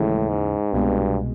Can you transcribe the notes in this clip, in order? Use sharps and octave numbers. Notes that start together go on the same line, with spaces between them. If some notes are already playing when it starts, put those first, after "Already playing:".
Already playing: D#2 A2 C#3 E3 G#3
G#2
C2 G2 B2 G#3